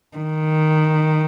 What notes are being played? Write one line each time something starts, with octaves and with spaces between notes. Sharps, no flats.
D#3